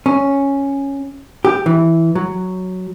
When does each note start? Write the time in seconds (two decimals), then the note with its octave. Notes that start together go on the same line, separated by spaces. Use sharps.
0.06 C#4
1.45 G4
1.66 E3
2.15 F#3